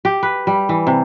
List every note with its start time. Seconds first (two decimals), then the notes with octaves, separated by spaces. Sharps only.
0.05 G4
0.23 B4
0.47 G3
0.69 E3
0.87 C3